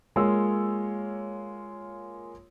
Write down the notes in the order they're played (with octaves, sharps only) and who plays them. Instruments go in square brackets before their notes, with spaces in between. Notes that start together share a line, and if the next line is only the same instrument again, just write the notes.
[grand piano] G#3 A#3 F4 C#5 E6